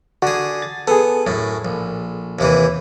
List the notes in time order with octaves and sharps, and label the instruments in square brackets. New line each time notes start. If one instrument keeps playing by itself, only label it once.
[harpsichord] D3 G#4 [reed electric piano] F#4
[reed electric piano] A6
[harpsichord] B3 [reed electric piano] G#4 A4
[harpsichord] F#2 A2
A#1
D#2 C3 E3